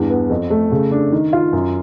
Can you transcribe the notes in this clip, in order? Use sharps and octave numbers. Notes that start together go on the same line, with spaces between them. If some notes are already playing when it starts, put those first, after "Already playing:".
Already playing: E2 G2
B3
F2
A3
C#3
D4
D#3
F4
F#2